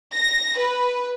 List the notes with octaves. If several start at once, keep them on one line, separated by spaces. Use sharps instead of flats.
A#6
B4